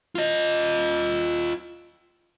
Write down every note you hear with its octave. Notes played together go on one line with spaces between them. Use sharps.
F4 D#5